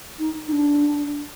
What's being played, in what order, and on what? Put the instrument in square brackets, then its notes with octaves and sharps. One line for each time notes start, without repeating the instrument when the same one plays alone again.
[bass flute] D#4
D#4
D4